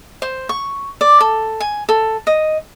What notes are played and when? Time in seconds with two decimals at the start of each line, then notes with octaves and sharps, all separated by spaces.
0.22 C5
0.49 C#6
1.01 D5
1.20 A4
1.60 G#5
1.89 A4
2.27 D#5